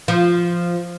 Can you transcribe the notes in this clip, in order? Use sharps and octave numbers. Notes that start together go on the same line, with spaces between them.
F3